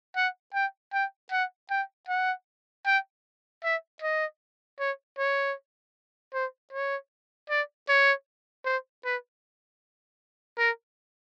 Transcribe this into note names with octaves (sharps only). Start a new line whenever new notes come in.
F#5
G5
G5
F#5
G5
F#5
G5
E5
D#5
C#5
C#5
C5
C#5
D5
C#5
C5
B4
A#4